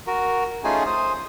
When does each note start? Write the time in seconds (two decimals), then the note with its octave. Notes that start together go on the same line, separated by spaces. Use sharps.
0.07 F#4 A#4
0.64 A3 C#4 D#4 F4 G#4 G#5
0.86 C5 D#6